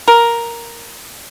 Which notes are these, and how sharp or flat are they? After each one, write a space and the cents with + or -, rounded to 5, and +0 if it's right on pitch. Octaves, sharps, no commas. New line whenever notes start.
A#4 +5